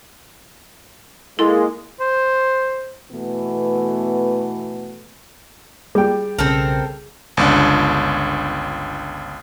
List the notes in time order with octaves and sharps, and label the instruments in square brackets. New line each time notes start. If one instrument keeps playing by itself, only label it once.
[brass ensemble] G#3 A#3 [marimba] E4 A4 C6
[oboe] C5
[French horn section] B2 E3 A3 B3
[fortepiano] G3 G5 [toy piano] G#4
[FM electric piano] B1 C#3 [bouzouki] C4 A4 A#4
[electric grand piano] G1 C#2 D4